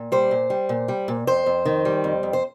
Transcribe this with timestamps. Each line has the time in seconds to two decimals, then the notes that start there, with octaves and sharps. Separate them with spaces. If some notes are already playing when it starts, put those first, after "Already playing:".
Already playing: A#2
0.12 G3 C5
0.31 A#2
0.50 G3
0.69 A#2
0.88 G3
1.08 A#2
1.27 F2 C5
1.46 F2
1.65 D#3
1.85 G3
2.04 F2
2.23 F2
2.33 C5